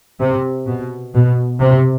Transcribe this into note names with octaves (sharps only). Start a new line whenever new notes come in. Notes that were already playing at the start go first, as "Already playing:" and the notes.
C3
B2
B2
C3